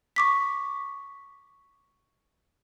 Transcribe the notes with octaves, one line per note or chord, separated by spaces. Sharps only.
C#6 D6 B6